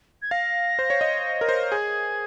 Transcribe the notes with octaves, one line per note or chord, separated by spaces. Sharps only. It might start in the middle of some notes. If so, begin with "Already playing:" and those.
G#6
F5 A#6
C5
C#5
D#5
A#4
C5
G#4 G#6